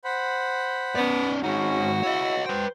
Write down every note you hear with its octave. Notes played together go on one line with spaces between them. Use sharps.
C5 F#5 B5
B3 C#4 D5
D#3 G#3 C#4 F#4
E4 C#5 D#5
B4 C5 G5